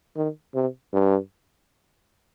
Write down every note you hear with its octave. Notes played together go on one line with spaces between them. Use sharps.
D#3
C3
G2